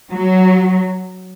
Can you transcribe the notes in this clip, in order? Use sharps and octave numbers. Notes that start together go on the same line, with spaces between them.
F#3